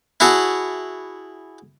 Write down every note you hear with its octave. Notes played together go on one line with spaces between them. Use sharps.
E4 F#4 G#4 C#5 A5